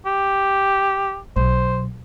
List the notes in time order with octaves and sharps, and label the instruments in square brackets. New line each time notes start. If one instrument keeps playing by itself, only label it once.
[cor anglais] G4
[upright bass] B1 [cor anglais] C5